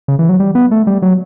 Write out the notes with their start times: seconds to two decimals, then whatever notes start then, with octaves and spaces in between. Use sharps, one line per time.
0.08 C#3
0.19 E3
0.29 F#3
0.40 G3
0.55 B3
0.71 A3
0.87 G3
1.02 F#3